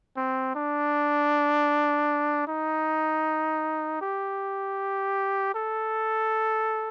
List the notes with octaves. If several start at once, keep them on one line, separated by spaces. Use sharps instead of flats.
C4
D4
D#4
G4
A4